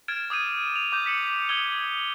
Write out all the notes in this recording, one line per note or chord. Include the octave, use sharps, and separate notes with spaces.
F6 G#6 A6 D7 E7
D6 D#6 G6 D#7
F7
D6 G6
B6 C#7 F#7
D#6 G#6 G7